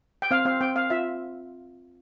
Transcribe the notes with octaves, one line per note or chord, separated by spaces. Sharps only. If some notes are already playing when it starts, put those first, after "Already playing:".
G5
C4 F5
C4 F5
C4 G5
C4 F5
F4 E5